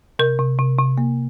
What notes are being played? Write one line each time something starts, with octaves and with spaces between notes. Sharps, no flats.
C3 A#4
C3
C3
C3
A#3